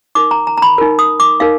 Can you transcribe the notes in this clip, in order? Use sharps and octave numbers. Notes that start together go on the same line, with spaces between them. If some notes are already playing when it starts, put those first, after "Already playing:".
D#4 A#4 D6
A#5
A#5
A#5
B5
D#4 A#4
D#6
D6
D#4 A#4 F5